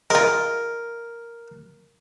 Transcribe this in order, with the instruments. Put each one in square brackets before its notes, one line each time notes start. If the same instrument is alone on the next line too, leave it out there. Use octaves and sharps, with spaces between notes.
[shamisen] G#3 F4 [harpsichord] A#4